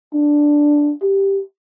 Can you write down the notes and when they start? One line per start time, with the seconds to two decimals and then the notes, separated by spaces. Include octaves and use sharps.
0.14 D4
1.02 G4